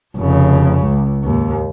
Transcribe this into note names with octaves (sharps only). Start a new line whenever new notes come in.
F1 C#3
C#2
D#2 G#2